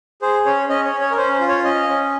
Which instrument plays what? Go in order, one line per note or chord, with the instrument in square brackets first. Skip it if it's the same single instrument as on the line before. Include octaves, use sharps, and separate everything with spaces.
[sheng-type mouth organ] G#4 C5
C#4 C#5
C#4 D#5
C#5
C#4
C#5
A#4
C#4 C5
C5
F4
C#5
C#4 D#5
C#4